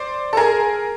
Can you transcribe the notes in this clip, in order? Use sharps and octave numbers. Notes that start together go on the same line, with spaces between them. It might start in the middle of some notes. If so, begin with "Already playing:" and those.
Already playing: C5 D5
A4
G#4 A#4